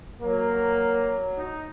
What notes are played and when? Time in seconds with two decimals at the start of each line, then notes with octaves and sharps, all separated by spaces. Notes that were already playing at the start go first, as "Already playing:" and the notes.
0.22 F#3 A#3
1.37 D#4